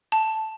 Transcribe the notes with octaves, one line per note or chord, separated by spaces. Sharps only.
A5